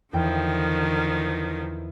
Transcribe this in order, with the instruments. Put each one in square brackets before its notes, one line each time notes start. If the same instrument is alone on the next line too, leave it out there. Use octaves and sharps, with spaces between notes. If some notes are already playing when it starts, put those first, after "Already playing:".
[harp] E2 G5 [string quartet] D3 D#3 F3